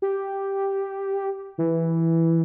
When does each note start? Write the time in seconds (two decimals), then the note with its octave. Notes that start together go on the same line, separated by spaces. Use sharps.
0.02 G4
1.58 E3